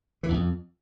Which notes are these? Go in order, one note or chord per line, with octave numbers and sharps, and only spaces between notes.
E3
E2
F2